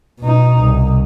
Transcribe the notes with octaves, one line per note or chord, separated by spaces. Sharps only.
B2 D#4
C2